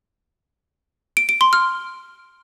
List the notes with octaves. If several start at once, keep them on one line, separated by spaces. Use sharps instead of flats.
D7
D7
C6
F6